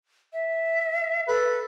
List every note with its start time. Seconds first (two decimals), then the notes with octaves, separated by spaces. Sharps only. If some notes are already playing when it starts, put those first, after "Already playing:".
0.33 E5
1.28 A4 B4